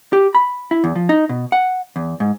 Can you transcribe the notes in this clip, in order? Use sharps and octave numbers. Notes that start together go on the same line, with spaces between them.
G4
B5
E4
E2
F3
D#4
B2
F#5
E2
G#2